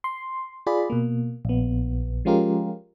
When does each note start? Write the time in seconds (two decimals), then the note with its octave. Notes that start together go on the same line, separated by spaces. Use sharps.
0.04 C6
0.66 F4 G#4 D5 B5
0.90 B2 A#3
1.45 A#1 B3
2.25 F3 G#3 C#4 F4 G4 A#4